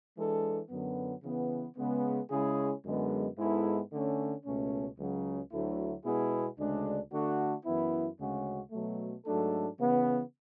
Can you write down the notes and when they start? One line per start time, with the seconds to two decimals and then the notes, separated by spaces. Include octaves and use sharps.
0.18 E3 G#3 D4 A4
0.70 F#2 D3 F#3 B3
1.24 C#3 E3 B3
1.77 C#3 G#3 B3
2.31 C#3 G#3 C#4 E4 G#4
2.85 F#2 D3 G#3 B3
3.38 G#2 G#3 B3 E4 A4
3.92 D3 A3 C#4
4.45 C#2 B2 A3 C#4
4.98 C#2 C#3 F#3
5.52 D2 D3 F#3 A3 E4
6.05 B2 G#3 B3 E4 G#4
6.59 D2 C#3 G#3 D4
7.12 D3 A3 D4 F#4
7.66 F#2 E3 B3 E4
8.19 D2 C#3 G#3 C#4 F#4
8.71 B2 F#3 A3
9.26 G#2 F#3 A3 D4 A4
9.79 C#3 E3 B3